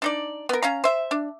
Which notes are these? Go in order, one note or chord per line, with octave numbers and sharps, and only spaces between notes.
D4 D#4 D5
B3 A#4
C#4 F5 A#5
C5 E5
D4